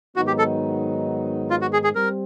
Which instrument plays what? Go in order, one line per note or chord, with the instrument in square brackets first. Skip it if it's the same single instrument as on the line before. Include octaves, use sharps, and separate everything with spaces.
[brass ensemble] G#2 D#3 F#3 B3 D#4 [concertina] F#4
[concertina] G4
A4
F4
F#4
G#4
G#4
[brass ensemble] G3 C4 [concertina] A#4